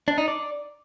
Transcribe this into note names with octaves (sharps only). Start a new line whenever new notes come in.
D4
D#4
D5